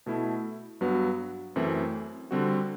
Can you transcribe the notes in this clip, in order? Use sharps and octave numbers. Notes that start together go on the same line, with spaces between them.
B2 A3 E4
G2 F#3 B3 F#4
F#2 E3 A3 C4
D3 G3 C4 F#4